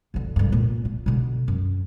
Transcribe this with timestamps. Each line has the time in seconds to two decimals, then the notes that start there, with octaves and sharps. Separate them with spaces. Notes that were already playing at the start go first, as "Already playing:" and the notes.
0.14 F#2 D3
0.36 G2 D3
0.52 A#2 A#3
0.85 F4
1.06 B2 D3
1.48 F#2